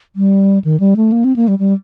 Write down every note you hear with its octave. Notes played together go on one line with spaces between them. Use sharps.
G3
D#3
G3
A3
A#3
C4
A#3
G3
G3